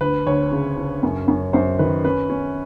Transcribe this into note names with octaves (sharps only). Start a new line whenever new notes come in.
D2 B4
D2 C#5
C#3
C#3
F#2
F#2
F#2 C5
D#3 B4
C#4 B4
C#4